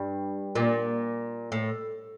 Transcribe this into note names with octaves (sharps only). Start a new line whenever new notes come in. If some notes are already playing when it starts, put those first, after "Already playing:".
Already playing: G2
A#2
A2